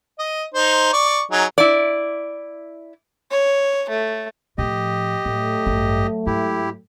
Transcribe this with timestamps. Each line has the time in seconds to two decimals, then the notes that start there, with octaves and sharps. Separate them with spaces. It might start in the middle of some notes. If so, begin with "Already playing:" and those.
0.19 D#5
0.55 D#4 C5
0.93 D5 C#6
1.31 F#3 D#4 G#4
1.58 E4 D5
3.31 C#5
3.89 A3
4.58 A2 F3 G4 D#5
5.26 A2 F#3 A3
5.66 A1 G2
6.26 G#2 E4 G4